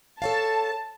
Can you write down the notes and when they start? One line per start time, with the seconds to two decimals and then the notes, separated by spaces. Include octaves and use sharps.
0.22 A4 C#5 F5 A5